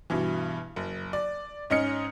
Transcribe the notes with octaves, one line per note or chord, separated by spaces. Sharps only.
G2 B2 E3
F#1
D5
G#2 C#4 D#5 F6 C#7